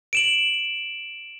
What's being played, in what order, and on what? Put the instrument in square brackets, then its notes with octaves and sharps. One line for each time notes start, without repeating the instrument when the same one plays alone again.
[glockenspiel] D7 E7 F#7